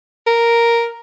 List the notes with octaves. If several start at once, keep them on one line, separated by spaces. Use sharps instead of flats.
A#4